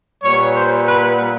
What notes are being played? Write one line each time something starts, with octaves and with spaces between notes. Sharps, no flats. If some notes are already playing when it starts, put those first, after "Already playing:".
A#2 G3 B3 C#5
C5
B4